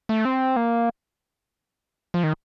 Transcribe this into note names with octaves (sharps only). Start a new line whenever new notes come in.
A3
C4
A#3
F3
D#3